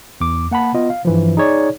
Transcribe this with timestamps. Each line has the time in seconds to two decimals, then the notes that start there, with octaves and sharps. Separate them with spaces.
0.21 E2 D6
0.51 A#3 F#5 A5 B5
0.75 B3 F4 D#5
0.90 F5
1.05 G2 E3 F3
1.37 D#4 G#4 C#5 D5